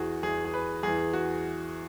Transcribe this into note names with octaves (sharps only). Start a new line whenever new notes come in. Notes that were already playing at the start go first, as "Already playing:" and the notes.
Already playing: E2 E3 F#4 G#4
E2 E3 G#4
G#4
B4
E2 E3 G#4
F#4